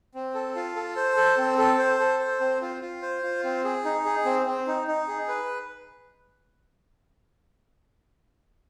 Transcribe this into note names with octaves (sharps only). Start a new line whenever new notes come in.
C4
A4
F4
A4
C5
A4
C4
A4
C5
A4
C5
C4
F4
F4
C5
F4
C4
G#4
D#4
G#4
C4
C4
D#4
D#4
G#4
B4